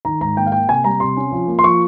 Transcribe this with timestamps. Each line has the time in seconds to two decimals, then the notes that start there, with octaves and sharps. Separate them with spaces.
0.05 D#3 A#5
0.21 G#2 A#5
0.37 A#3 G5
0.46 F5
0.52 A#3 G5
0.68 C3 G#5
0.84 G3 A#5
1.00 C3 C6
1.17 C#4
1.32 F3
1.48 A#3
1.59 C6
1.64 F3 C#6